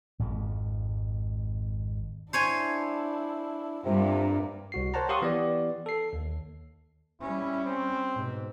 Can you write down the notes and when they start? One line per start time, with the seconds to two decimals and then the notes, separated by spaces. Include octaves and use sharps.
0.19 G#1 F2 G#2
2.33 D4 E4 C5 C#5 G#5
3.84 G2 C3 A#3 F4
4.72 C2 F#4 C7
4.94 A#4 C5 C#5 F#5 A5 A#5
5.09 G4 F5 C6 C#6 D#6
5.22 E3 B3 G4 D5
5.86 A4 C7
6.13 D#2
7.21 G3 C#4 E4
7.65 C4
8.15 G#2 B2